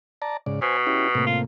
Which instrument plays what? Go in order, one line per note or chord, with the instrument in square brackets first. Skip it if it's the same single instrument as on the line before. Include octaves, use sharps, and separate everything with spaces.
[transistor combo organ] D5 A5 A#5
G#2 C#3 D5
[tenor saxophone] B2 [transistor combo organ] C5 G#5
[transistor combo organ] C#4 E4 G4
A2 C3 A#3
[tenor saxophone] F4